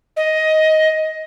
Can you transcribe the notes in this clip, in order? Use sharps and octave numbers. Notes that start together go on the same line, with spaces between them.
D#5